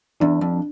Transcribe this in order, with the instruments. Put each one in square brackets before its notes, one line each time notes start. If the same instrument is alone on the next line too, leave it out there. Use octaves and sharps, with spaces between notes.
[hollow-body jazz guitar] E2 [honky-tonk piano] D4
[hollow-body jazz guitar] F2